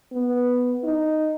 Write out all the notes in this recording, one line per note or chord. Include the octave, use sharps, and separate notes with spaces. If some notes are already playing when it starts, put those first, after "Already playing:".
B3
D#4